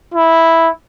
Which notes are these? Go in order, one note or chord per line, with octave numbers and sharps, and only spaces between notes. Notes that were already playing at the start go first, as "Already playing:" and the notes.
E4